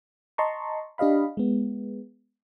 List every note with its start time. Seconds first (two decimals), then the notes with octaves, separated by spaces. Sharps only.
0.38 D#5 A5 A#5 C6 C#6
0.98 D4 G4 D#5 F5 B5
1.37 G#3 B3